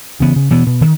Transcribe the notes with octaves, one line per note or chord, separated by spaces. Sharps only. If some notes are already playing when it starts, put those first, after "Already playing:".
C#3 E3 B3
C#3
B2 E3 B3
B2
D#3